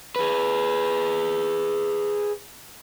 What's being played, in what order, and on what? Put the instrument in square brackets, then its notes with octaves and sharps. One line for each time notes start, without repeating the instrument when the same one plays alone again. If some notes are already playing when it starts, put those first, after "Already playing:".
[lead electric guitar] G#4 B4